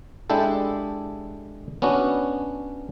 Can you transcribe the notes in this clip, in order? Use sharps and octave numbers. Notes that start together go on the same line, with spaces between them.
G#3 D4 E4 G4 A4
B3 C#4 D4 F#4